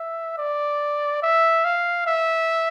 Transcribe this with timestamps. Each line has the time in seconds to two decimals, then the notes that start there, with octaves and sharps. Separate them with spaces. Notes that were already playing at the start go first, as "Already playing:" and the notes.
Already playing: E5
0.38 D5
1.23 E5
1.65 F5
2.07 E5